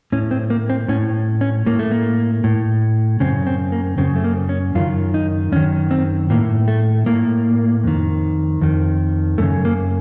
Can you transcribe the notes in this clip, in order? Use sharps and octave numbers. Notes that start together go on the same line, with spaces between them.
A2 C#4
C4
A#3
C4
A2 C#4
C#4
A2 A#3
A3
A#3
A2
F#2 C#3 C4
C4
A#3
F#2 C#3 C4
A3
A#3
C#4
F#2 D#3 F4
D#4
F#2 D#3 C#4
C4
A2 A#3
A3
A2 A#3
F2 D#3
F2 D#3
F#2 C#3 A3
A#3